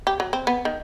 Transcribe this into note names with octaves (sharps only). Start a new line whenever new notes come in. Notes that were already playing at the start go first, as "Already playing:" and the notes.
G4
F#3
C4
B3
D#3